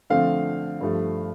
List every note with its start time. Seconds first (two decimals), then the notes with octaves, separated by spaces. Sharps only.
0.10 D3 F3 A3 C4 F5
0.81 G2 F3 A3